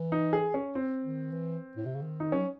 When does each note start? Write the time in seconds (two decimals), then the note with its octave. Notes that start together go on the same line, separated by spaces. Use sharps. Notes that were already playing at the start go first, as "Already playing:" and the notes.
Already playing: E3
0.12 D#4
0.33 G#4
0.54 C#4
0.75 C4
1.04 D#3
1.32 E3
1.77 A2
1.86 C3
1.95 C#3
2.02 D#3
2.20 D#4
2.32 F#3 C#4